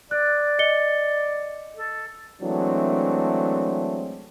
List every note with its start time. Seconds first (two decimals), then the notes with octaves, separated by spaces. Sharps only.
0.11 D5 F#6
0.59 D#5 C#7 G7
1.77 A4
2.42 E3 F#3 G#3 A3 C4 D4